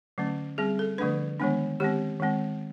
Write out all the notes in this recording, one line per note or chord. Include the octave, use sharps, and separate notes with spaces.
D3 F#3 A3 C#4
G3 C4 G#4
A4
D3 F3 A3 D4 B4
D#3 G#3 B3 D4
D#3 G#3 C4 G4
D#3 G#3 C4